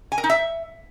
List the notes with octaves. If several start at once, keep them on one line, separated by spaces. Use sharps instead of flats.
G#5
A#4
D#4
E5